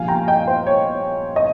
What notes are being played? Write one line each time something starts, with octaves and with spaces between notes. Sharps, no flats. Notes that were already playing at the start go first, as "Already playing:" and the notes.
Already playing: A#1 A#2 G3 F5 G#5
G5 A#5
D#5 G5
C5
C#5
D#5